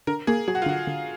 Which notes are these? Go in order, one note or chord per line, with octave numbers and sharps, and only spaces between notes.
D3 A#4
A#3 G#4
F#3 G#4
F#4
F4
D3 F#4
D3